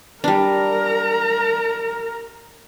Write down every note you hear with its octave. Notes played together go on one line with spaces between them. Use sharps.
G3 D4 A#4 A#5